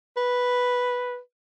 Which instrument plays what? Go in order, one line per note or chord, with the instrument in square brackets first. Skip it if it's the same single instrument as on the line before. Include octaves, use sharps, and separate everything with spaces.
[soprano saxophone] B4